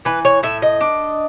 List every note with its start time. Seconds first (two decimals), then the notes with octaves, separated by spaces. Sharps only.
0.05 E3 B4
0.25 C#5
0.43 A2 E5
0.62 D#5
0.81 D4